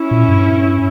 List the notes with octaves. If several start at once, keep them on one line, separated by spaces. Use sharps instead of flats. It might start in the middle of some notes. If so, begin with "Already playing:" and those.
Already playing: C#4 E4
A#2
G2